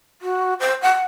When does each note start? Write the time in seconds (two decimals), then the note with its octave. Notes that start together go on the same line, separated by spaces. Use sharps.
0.21 F#4
0.60 C5
0.82 F#5